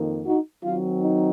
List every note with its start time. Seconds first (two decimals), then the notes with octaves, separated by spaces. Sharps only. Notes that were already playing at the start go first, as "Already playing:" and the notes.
Already playing: F2 D#3 A#3
0.25 D#4 F#4
0.63 D#3 F#3 C4 F4
1.02 D#4